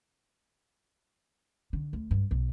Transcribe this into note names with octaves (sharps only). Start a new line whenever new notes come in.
D3
D2
G2
B1